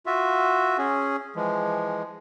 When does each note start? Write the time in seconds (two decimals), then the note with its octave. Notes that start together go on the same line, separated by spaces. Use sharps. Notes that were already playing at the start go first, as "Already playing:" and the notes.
0.06 F4 F#4 E5
0.78 C#4 G#4
1.36 E3 F3 G#3